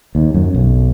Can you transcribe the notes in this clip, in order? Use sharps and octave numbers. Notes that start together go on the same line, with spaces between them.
D#2
F#2
B1